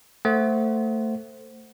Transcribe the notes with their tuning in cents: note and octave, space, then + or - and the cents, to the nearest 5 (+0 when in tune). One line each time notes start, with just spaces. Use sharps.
A3 +20 C5 +0 F#5 +10